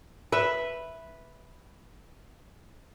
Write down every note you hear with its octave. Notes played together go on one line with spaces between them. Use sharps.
B4 E5